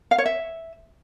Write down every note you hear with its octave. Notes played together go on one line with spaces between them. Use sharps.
F5
C#5
E5